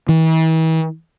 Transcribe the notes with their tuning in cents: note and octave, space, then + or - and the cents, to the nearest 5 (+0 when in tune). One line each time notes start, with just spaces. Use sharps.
E3 -40